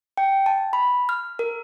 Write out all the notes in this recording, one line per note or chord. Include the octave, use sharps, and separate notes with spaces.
G5
A5
B5
F6
A#4